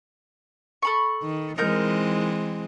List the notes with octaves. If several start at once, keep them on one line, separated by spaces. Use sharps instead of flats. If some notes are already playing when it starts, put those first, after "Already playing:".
A4 B5 C#6
D#3
E3 G#3 C4 D#4 A#4 G6